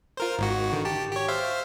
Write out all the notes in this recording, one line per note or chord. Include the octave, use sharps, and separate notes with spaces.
F4 A#4 C5
G#1 G#2 F#4
D3 D#3
G4 A5
G4 C#5
C5 E5 F5